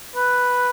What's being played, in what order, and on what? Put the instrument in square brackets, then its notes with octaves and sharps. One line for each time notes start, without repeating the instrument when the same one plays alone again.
[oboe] B4